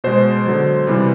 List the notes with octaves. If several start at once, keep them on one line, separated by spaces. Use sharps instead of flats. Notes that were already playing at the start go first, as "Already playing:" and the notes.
B2 G#3 C5
D3 F#3
C3 E3 G3